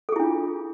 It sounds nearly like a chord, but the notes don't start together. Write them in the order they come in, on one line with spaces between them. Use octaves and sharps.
A4 G#4 E4 D4 F4